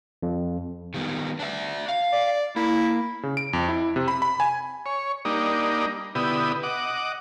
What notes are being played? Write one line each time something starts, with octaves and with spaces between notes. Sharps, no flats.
F2
D#3 G3 B3
D4 D5 E5
F5
D5
A#3 E4
C#3
D7
F2
E4
C3
B5
B5
G#5
C#5
G3 A#3 D4 D#4
B2 D3 B3 E4 G4 D#6
D#5 F#5 D6